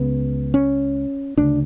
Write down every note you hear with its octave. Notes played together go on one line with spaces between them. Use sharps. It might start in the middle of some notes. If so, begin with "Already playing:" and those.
Already playing: C#2 C#3 B3
C#4
D2 C#3 D4